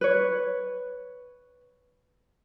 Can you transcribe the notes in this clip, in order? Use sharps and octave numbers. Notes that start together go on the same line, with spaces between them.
B4 C#5